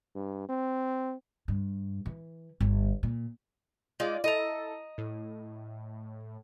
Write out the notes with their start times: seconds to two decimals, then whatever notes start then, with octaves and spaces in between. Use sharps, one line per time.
0.15 G2
0.49 C4
1.48 G2
2.06 E3
2.60 G1
3.03 A#2
4.00 G#3 D#4 F4 D5
4.24 E4 A4 D#5 A#5
4.98 A2